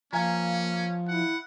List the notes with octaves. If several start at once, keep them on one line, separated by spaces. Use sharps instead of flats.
F3 A#3 C#4 F5 G#5 A#5
E4 F#5